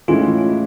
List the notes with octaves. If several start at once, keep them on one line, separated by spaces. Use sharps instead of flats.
A2 E3 G#3 C#4 F4